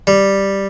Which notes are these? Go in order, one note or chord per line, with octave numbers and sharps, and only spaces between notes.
G3